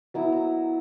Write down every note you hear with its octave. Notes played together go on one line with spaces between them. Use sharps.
F#3 B3 E4 A#5
A#5